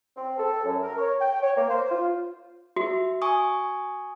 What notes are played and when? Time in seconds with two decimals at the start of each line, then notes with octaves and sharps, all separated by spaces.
0.17 C4
0.38 A4
0.64 F#2
0.82 A#4
0.98 C#5
1.21 G5
1.42 C#5
1.57 A#3
1.69 C5
1.91 F4
2.76 F#4 E5
3.22 G#5 C#6 D#6